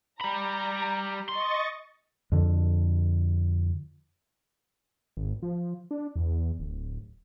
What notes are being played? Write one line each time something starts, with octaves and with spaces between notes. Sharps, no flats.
G3 A#5 B5
D#5 C6 C#6 A6
F2 D3
G#1
F3
D4
E2
D1